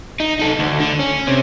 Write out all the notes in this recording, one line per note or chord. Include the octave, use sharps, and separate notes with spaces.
D#4
D#4 A4
D2
D3
C#4
C3